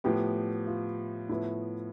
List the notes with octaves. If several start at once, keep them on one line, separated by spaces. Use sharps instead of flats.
A2 F3 B3 G4
F4
A2 F3 B3 E4